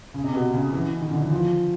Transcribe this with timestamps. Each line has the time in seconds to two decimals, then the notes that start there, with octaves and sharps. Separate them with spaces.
0.14 C#3
0.24 C3
0.34 B2
0.53 C#3
0.73 E3
1.02 D#3
1.12 D3
1.22 E3
1.31 F3